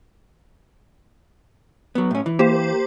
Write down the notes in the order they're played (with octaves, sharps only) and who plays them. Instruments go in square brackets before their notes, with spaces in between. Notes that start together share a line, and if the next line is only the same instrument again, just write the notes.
[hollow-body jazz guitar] F#3 B3
A2 C#4
E3
[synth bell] A#3 G4 C5